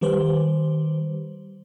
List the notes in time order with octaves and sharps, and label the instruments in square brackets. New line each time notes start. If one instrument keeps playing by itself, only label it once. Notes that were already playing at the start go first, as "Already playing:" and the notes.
[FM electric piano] D#3 G3 G4 B4 C5